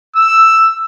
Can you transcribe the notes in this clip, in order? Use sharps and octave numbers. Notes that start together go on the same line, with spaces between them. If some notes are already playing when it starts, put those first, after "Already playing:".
E6